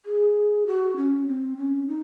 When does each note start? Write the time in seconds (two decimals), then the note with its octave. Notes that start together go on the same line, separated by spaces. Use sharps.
0.05 G#4
0.67 F#4
0.96 C#4
1.27 C4
1.57 C#4
1.88 D#4